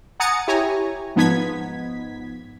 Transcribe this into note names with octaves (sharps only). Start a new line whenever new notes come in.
F#5 G#5 A#5 D#6 A6 C#7
E4 G4 C#5 G#5 A#5
G#2 F3 B3 D#4 G#6 B6